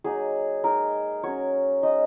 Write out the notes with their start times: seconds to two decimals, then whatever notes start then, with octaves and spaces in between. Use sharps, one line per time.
0.04 F#3 A#3 D#4 G#4
0.64 G#3 D#4 A#4
1.23 F#3 C#4 C#5
1.83 G#3 D#4 D#5